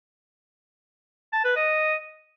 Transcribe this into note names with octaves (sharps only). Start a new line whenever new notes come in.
A5
B4
D#5